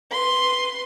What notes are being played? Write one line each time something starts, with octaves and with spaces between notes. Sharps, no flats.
B4 C6